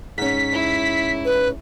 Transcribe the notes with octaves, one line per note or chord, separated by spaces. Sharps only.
G#2 C#4 B6
E4
B4